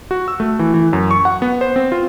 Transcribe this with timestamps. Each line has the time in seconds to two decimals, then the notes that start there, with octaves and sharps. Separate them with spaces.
0.11 F#4
0.28 E6
0.40 A3
0.59 E3
0.74 E3
0.93 F#2
1.11 C#6
1.25 F#5
1.42 B3
1.61 C5
1.76 C4
1.92 F4